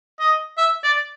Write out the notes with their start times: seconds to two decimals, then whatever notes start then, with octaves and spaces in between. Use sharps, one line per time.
0.20 D#5
0.58 E5
0.84 D5